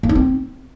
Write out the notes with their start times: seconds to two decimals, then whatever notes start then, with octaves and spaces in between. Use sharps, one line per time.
0.03 A#3
0.09 D#4
0.15 C4